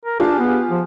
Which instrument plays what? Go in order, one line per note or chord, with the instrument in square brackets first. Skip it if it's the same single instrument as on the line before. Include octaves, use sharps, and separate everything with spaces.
[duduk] A#4
[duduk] D4 [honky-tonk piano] F4 G4 G#4
[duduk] B3
F3